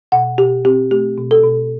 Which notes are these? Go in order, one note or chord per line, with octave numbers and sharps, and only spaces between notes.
B2 F#5
B2 G4
C4 G4
A3 G4
B2
A4
B2